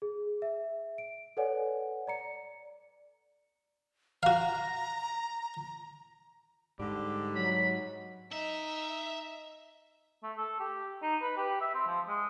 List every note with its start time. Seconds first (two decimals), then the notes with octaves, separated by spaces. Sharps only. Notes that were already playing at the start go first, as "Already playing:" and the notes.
0.02 G#4
0.42 E5
0.98 D7
1.37 A4 B4 C#5 D5 F#5 G#5
2.07 D5 A#5 C#7
4.23 F#4 F5 A#5
6.79 G#2 D3 G3 G4
7.35 F#3 B5
8.32 D#4 E5
10.23 A3
10.37 A4
10.60 G4
11.02 D#4
11.22 B4
11.37 G4
11.61 E5
11.74 C4
11.87 F3
12.08 G#3